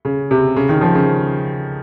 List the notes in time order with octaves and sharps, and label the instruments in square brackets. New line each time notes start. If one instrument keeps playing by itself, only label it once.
[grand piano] C#3
C3
C#3
D#3
F3
C#3